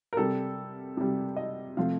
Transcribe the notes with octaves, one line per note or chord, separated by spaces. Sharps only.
A#4
C3 G3 A4
C3 G3
D#5
C3 F3 A3 F5